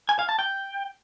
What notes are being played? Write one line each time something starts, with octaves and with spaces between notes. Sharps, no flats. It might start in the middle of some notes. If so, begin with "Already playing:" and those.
G#5
F5
A5
G5